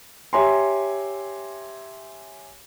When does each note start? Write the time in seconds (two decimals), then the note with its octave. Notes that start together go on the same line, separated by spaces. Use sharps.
0.33 G4 C#5 E5 G#5 A#5 C6